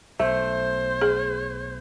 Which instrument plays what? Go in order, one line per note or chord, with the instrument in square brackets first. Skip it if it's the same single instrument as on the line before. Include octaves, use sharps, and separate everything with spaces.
[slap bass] B1 [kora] A3 [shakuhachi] C5
[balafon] G#4